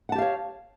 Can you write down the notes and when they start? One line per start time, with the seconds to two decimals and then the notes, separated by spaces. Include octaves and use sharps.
0.09 F#5
0.12 A5
0.15 G4
0.18 F5
0.22 C#5